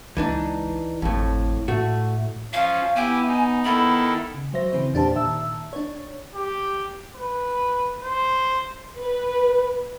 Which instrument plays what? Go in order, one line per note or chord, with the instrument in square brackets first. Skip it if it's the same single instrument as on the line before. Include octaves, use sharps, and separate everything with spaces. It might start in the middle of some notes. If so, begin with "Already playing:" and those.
[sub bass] C#2 [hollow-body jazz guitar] E3 D4 D#4
[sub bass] G#1 [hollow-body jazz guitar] F2 A2
[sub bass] A2 [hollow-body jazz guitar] A3 F#4
[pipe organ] F3 C#4 [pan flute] F5
[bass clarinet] B3 [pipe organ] E4 G4 D6 [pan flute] G#5
[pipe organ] D#4
[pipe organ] D#3 E4 A4 [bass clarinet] B3 [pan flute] B5
[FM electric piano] C#3
F#3 C5 E5 A#6
C#3 E3 C4 C5
E2 A#2 D4 G4 C5 A5
A#2 D#3 E5 A5 E6
D4 C#5
[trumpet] G4
B4
C5
[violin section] B4